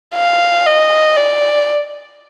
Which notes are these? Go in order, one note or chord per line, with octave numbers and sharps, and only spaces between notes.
F5
D#5
D5